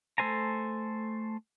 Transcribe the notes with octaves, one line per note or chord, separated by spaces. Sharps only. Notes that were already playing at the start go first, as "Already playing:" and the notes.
A3 A4 C5 G#5 A#5